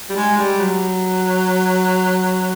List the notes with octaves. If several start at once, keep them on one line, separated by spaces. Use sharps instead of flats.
G3
G#3
G3
F#3